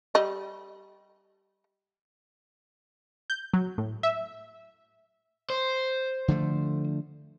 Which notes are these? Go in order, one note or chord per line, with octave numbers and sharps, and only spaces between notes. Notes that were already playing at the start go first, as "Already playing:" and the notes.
G3 D#5
G6
F#3
A2
E5
C5
D3 F3 A3